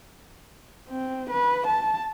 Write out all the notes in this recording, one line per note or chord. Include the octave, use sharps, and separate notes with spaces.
C4
B4
A5